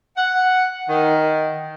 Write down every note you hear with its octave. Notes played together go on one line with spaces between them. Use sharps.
F#5
D#3